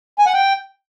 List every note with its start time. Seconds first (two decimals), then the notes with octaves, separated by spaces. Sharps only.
0.19 G#5
0.26 F#5
0.34 G5